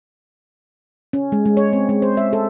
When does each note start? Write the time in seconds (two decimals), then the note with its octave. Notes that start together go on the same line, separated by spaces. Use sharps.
1.13 C#4
1.32 G#3
1.46 G#3
1.57 C#5
1.73 C4
1.89 G#3
2.02 C5
2.17 E5
2.33 A4